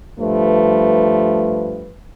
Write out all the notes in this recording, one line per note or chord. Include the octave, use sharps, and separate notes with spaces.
G2 F3 A3 B4